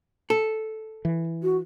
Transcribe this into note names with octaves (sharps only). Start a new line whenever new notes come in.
A4
E3
F#4